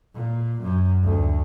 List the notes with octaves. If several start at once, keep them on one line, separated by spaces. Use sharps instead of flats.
A#2
F#2
D2